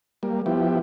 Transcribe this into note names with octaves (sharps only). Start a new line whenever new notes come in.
G3 A#3
F3 B3 E4 G4